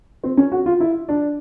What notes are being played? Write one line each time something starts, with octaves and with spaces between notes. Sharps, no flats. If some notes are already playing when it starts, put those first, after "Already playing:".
C4
C#4
F#4
F4
E4
D4